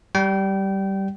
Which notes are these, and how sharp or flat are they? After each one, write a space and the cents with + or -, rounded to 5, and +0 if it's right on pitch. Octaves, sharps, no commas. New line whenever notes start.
G3 -10 G5 -25